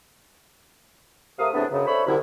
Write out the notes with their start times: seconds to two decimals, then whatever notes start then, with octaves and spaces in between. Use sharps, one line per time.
1.39 C3 A3 A#4 F5 D#6
1.54 E2 A2 C3 B3 D4
1.72 F#2 C#3
1.86 D4 A4 C5 C#5 E5 B5
2.06 C2 F#2 D3 E4